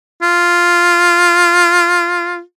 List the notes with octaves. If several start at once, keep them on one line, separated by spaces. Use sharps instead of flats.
F4